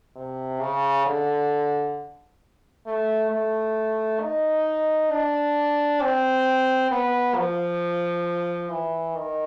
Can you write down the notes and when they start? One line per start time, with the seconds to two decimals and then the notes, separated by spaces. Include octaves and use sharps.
0.16 C3
0.61 C#3
1.06 D3
2.86 A3
3.31 A3
4.21 D#4
5.11 D4
6.01 C4
6.91 B3
7.36 F3
8.71 E3
9.16 D#3